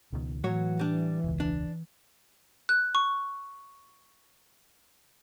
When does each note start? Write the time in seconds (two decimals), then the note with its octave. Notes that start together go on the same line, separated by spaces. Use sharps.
0.13 C#2 B2 D#3
0.44 A2 E3 F#3 F#4 C#5
0.79 G3 D4
1.24 E1 C#2
1.40 D4
2.69 F#6
2.95 C#6